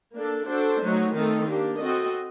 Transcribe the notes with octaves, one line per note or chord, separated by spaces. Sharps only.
A#3 D4 A4
D4 F#4 A4 C5
F#3 A3 D#4
D#3 A3 C4 D#4 A4
A#3 D4 G4
C4 F#4 A4 D#5